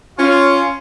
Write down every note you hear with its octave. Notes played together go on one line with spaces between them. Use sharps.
C#4 F4